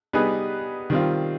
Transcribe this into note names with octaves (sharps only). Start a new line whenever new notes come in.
G3 B3 D#4 G#4 B4
D#3 G3 C4 F4